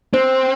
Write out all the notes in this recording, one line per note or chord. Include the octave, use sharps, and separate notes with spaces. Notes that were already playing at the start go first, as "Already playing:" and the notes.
C4 C5